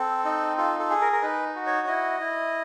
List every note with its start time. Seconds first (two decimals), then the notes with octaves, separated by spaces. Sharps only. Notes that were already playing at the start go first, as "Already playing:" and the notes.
Already playing: C4 A4
0.25 D#4
0.57 F4 A4
0.79 A4
0.90 G#4
1.01 A#4
1.12 A#4
1.22 D#4 B4
1.56 F#4
1.66 C#5
1.87 E4 D#5
2.20 E4